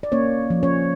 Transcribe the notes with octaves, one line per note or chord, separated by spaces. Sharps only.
D5
A#3 C#4 C#5
F3
C#4 C#5